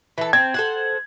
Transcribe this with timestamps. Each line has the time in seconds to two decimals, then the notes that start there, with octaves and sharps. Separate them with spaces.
0.18 E3 A4
0.33 C4 G#6
0.54 A4 C5 F#5